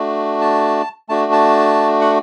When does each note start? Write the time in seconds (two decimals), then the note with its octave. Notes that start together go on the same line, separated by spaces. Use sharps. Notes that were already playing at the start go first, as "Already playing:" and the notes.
Already playing: A3 D4 F#4
0.41 A5
1.09 A3 D4 F#4 A5
1.33 A5
2.01 F#5